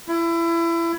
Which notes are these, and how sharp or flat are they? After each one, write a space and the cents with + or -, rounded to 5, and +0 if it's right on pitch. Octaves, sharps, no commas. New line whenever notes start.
E4 +25